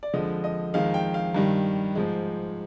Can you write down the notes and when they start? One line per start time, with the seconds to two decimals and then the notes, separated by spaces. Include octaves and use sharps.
0.03 D5
0.14 F2 D3 F3 G#3 D#5
0.44 D#5
0.74 F2 D#3 G#3 F5
0.94 G5
1.14 F5
1.34 G2 D#3 G3
1.95 G#2 F3 G#3